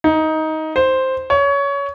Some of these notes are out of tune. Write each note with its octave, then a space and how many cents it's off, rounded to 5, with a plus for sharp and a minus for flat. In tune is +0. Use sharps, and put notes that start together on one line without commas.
D#4 +15
C5 +0
C#5 +20